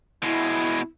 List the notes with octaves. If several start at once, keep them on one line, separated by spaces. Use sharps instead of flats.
B2 G#3 E4